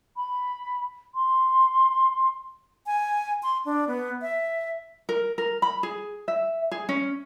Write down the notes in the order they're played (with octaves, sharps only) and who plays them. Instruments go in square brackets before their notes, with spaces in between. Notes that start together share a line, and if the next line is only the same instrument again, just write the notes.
[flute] B5
C6
[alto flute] G#5
C6
D4
B3
E5
[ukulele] A#4
A#4
B5
G#4
E5
G#4
C#4